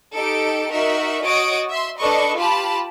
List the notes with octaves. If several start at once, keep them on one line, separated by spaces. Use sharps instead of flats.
D#4 G4 A4 D7
D#4 F#4 A#4 E5
F#4 C#5 D#5 D#6 A6 D7
E5 C6
D4 A4 B4 D#5 C#6
F4 G4 A5 B5